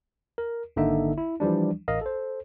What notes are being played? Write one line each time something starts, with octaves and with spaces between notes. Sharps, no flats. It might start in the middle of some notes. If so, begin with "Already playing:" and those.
A#4
G#1 D3 A#3 D#4 E5
E4
E3 F3 G3 D4
A1 A#4 D#5 F5
A4 C5